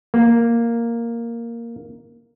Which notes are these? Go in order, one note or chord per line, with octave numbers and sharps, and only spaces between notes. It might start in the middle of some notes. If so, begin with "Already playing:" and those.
A#3